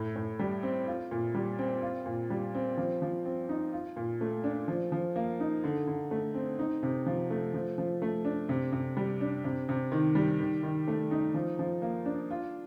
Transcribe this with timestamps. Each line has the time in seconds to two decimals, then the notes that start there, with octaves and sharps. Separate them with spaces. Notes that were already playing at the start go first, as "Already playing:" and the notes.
Already playing: A2
0.16 A2
0.39 G3
0.63 C4
0.87 F4
1.11 A#2
1.35 G3
1.59 C4
1.82 F4
2.06 A#2
2.30 G3
2.55 C4
2.77 F3
3.02 F3
3.25 C4
3.49 D#4
3.73 F4
3.96 A#2
4.21 A3
4.44 D4
4.68 F3
4.92 F3
5.16 A#3
5.40 D#4
5.64 D3
5.87 D3
6.11 A3
6.35 C4
6.59 D#4
6.83 C3
7.06 F3
7.30 A3
7.54 F3
7.78 F3
8.02 A3
8.25 D4
8.49 C3
8.73 C3
8.97 G3
9.21 D4
9.44 C3
9.69 C3
9.92 D#3
10.15 G3
10.40 D#3
10.63 D#3
10.88 A3
11.11 D#4
11.34 F3
11.59 F3
11.82 A#3
12.06 D4
12.31 F4